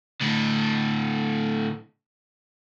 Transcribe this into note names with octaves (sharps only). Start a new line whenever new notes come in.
A2 D3